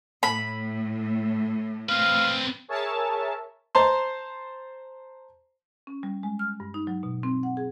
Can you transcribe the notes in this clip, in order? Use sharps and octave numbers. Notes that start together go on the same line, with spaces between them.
A2 B5
C4 B4 F5
G#4 A#4 C#5 E5 A5
C5 A5 A#5 C6
C#4
G3
G#3
F6
G2
D#4
F#3
B2
C4
F#5
G#4